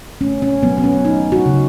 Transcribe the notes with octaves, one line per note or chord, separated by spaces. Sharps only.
A3 C#4
C#4
F#3 B3
B3
C#4
A3 D#4
F#4
C#3